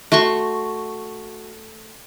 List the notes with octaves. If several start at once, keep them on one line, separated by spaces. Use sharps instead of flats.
A3 F#4 C6 C#6